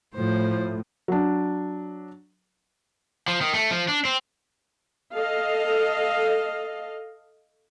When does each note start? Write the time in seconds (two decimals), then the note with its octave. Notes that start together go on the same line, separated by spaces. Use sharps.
0.15 A2 F3 C5
1.08 F#3 D4
3.28 F3
3.41 D#3
3.54 A3
3.71 F3
3.88 D4
4.05 C4
5.15 A4 D#5 F5